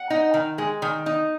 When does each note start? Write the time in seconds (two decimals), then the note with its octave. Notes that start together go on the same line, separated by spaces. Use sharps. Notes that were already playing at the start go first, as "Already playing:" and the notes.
Already playing: F#5
0.10 D#4
0.34 D#3
0.58 G#3
0.82 D#3
1.06 D#4